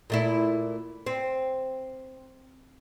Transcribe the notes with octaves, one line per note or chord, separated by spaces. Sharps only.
A#2 A3 E4
C4